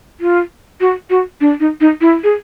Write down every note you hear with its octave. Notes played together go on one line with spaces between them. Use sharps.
F4
F#4
F#4
D4
D#4
D#4
E4
G#4